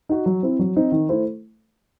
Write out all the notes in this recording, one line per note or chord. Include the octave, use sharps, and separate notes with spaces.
D#4 F#4
F#3
C4 E4
F#3
C4 D#4
D#3
A3 E4 A4 C5